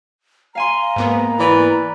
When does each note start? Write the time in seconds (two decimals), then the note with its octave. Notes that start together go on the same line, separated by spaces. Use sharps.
0.55 F5 G#5 A#5 C6
0.96 G#2 A#3 B3
1.40 E3 B4 D5